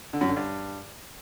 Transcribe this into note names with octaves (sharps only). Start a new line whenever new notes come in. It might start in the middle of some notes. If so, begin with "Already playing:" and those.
D3
F#2
D3
G2